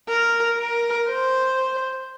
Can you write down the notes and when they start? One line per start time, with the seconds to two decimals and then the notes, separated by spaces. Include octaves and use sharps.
0.08 A#4
0.58 A#4
1.09 C5